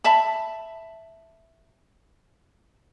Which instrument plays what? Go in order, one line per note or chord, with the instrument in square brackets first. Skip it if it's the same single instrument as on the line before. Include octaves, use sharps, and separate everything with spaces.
[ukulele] E5 A5 B5